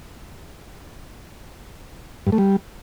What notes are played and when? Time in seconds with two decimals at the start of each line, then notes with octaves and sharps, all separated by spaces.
2.27 G2
2.32 A3
2.38 G3